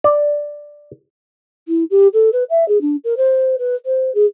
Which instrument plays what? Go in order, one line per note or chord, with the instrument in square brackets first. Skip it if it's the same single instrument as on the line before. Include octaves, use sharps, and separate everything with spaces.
[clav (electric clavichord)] D5
[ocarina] E4
G4
A4
B4
E5
G#4
D4
A#4
C5
B4
C5
G#4